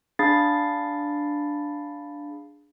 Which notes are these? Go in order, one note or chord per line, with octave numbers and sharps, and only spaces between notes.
D4 G#4 F5 B5 A6 C7